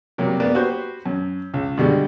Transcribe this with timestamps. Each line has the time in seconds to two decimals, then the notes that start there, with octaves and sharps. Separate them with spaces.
0.18 C3 F#3 G3 A#3
0.40 A#3 B3 D5
0.55 F#4 G4 B4 C5
1.06 F#2
1.54 C#2
1.78 B2 D3 G3 G#3